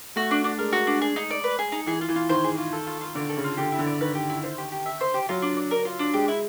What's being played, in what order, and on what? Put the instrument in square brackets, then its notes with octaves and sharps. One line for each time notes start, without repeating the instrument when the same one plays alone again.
[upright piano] A3 [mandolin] F#4
[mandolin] D4
D4
[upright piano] G#3 [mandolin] A#4
[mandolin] F#4
D4
G#4
D#4
D5
B4
G#4
D#4
[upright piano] E3 [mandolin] G#4
[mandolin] F4
[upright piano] E3
[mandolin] F4
[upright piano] D#3 [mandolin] C5
[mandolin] G#4
F4
A4
F4
F4
[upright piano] D3 [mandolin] D5
[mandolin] A4
[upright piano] C#3
[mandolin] F4
[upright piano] D3 [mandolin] G4
[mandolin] E4
[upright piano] D3
[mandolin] D5
[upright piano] D#3 [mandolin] B4
[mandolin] G4
E4
C5
G4
G4
E5
C5
G4
[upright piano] F#3 [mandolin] F4
[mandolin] D4
D5
A#4
F4
D4
[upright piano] G#3 [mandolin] G4
[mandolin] E4